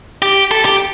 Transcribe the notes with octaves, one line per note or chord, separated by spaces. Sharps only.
G4
A4
G4